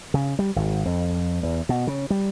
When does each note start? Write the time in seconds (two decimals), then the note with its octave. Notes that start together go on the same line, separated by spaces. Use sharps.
0.14 C#3
0.39 G3
0.56 G#1
0.85 F2
1.43 E2
1.69 B2
1.87 C#3
2.10 G3